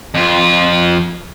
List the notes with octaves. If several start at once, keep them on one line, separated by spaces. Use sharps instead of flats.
F2 F4